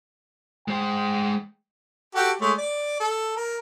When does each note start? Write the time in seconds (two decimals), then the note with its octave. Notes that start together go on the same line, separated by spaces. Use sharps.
0.68 G#3 C5 G5
2.15 F#4 G4 A4
2.41 G#3 A3 C#5
2.58 D5
3.00 A4
3.37 A#4